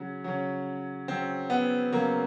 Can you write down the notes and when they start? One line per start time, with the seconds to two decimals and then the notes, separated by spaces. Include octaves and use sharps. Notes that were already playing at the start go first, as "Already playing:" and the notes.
Already playing: C#3 F#3
0.24 C#3 F#3
1.08 C#3 F#3 C4
1.50 B3
1.92 C#3 F#3 A#3